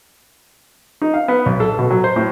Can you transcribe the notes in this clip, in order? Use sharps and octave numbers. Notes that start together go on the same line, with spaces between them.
D#4
F5
B3
B1
A4
B2
F#3
C5
A2